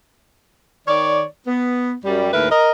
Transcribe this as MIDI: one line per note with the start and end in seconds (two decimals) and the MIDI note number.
0.88 1.24 51
0.88 1.24 73
0.88 1.24 74
1.48 1.93 59
2.05 2.31 42
2.05 2.31 55
2.33 2.50 39
2.33 2.50 45
2.33 2.50 70
2.33 2.50 71
2.33 2.50 76
2.51 2.71 70
2.51 2.71 75